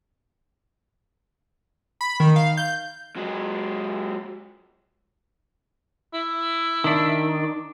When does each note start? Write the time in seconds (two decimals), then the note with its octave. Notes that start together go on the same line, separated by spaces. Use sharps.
2.01 B5
2.20 D#3
2.36 F5
2.57 G6
3.16 F#3 G#3
6.13 E4
6.84 D#3 D4